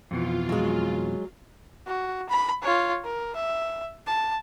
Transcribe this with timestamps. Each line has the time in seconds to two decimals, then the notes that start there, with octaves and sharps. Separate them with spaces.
0.11 F2 B2 E3 F4
0.49 F#3 G#3
1.87 F#4
2.29 B5
2.62 F4 C#5
3.04 A#4
3.36 E5
4.07 A5